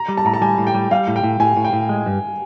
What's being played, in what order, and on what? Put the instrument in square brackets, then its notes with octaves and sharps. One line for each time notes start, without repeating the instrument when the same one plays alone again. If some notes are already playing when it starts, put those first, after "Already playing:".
Already playing: [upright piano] A#5
[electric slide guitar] G3
[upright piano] A5
[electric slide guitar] A2 [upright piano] A#5
[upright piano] A5
[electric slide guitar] G3 [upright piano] G#5
[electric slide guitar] A2
[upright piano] G5
[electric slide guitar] G3
[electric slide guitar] G3 [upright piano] F5
[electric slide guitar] A2
[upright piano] G5
[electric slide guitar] A2
[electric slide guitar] A2 [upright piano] G#5
[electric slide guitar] A2
[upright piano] G5
[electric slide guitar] A2
G#3
G2